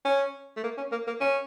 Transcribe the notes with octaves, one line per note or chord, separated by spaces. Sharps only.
C#4
A3
A#3
C#4
A#3
A#3
C#4